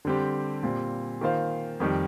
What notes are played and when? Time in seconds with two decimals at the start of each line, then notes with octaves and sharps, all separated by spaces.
0.05 D3 G3 C4 G4
0.63 A#2 G3 C4 F4
1.21 D#3 A#3 F4 C5 F5
1.80 F2 D#3 G3